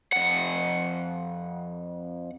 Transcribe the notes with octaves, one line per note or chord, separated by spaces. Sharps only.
F2 F#5